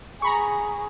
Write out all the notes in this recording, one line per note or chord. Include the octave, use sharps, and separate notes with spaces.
G#4 A#5 B5 C#6